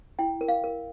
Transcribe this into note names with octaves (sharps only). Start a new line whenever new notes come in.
E4 G5
A#4
F5
A#4